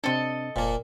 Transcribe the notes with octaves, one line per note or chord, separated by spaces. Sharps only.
C3 C4 D4 A4 D#5
F1 A#2 A#3 C5 F5 A5